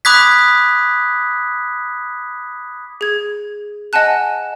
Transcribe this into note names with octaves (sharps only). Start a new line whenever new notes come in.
B5 D6 D#6 F#6 G#6 B6
G#4 G#6
D#5 F#5 G#5 A5 F#6